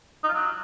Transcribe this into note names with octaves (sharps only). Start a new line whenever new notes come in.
D#4
F4
F#3